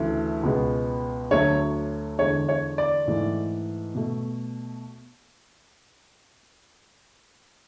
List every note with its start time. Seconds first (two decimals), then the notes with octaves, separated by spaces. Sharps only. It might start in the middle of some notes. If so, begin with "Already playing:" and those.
Already playing: D2 C#3 E3 A3
0.43 C#2 B2 G#3 B3
1.31 D2 D3 F#3 A3 C#5
2.19 E2 D3 G#3 C#5
2.49 C#5
2.78 D5
3.07 G#2 E3 A3
3.95 B2 A3